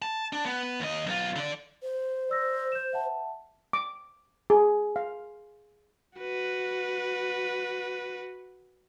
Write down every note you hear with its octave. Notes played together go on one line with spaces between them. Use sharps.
A5
D4
B3
D#2 D#5
B1 F4
D3 D5
C5
D5 E6 A#6
G6 E7
E5 F#5 A5
D6
G#4
F5
F#4 B4